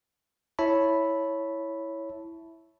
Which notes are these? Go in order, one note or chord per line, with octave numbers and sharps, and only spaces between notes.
E4 C#5 E5 A5 B5